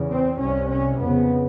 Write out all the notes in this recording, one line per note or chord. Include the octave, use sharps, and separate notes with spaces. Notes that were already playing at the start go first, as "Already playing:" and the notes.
Already playing: E2 C#3
C4
C2 C3 C#4
C#4
F2 C#3 B3